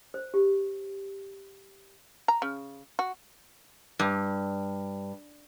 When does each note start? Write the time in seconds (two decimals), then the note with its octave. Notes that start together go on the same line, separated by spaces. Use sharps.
0.14 C5
0.34 G4
2.28 A#5
2.42 C#3
2.99 F#4
3.99 G2